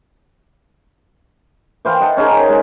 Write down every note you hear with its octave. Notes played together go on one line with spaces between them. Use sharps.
E3 C5 F5 G5
D#5 F#5 A5
C#4 D#4 G#4 A#4
C#3
G#3